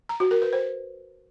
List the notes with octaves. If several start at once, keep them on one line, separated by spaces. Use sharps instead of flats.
A#5
F#4
A#4
B4
C5